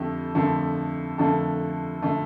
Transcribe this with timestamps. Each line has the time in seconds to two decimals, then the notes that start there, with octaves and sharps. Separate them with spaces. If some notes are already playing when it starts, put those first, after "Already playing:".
Already playing: F2 D3 A3 G4
0.35 F2 D3 A3
1.18 F2 D3 A3 A4
2.02 D3 A3